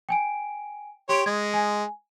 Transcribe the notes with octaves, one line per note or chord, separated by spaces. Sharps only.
G5 G#5 D7
G4 C#5 C6 D7
G#3 G#6
G#5